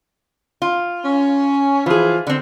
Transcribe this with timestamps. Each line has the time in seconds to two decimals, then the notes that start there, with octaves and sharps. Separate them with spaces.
0.62 F4
1.05 C#4
1.86 E3 F3 F4 G#4
2.27 D3 C4